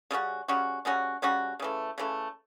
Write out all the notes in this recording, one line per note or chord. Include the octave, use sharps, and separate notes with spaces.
C#3 G3 C#4 F#4
C#3 G3 C#4 F#4
C#3 G3 C#4 F#4
C#3 G3 C#4 F#4
C#3 E3 A3
C#3 E3 A3